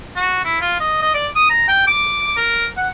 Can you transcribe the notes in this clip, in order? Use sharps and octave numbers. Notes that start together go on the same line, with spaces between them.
F#4
E4
F4
D#5
D#5
D5
D#6
A#5
G5
D6
A#4
F#5